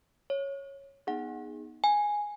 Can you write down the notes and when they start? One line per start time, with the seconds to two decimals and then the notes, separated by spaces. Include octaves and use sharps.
0.30 C#5
1.07 B3 D#4 G#4 F#5
1.84 G#5